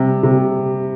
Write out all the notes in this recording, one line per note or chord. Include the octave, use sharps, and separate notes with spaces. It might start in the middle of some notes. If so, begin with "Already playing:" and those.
Already playing: C3 G3
C3